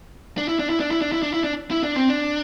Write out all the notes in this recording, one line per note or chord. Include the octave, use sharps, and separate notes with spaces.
D4
E4
D4
E4
D4
E4
D4
E4
D4
E4
D4
E4
D4
C4
D4